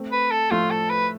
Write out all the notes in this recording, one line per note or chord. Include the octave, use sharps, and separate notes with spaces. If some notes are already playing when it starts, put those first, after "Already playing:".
Already playing: A3 C4
B4
A4
F3 A3 F4
A4
B4